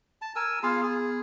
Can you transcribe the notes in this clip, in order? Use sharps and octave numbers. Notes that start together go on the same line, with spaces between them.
A5
A#4 G#5 E6
B3 F4 G#4 F5
G#4